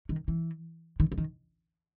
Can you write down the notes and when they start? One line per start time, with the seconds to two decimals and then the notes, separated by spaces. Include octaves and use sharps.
0.09 D#3
0.28 E3
1.00 D#3
1.12 C#3
1.18 D#3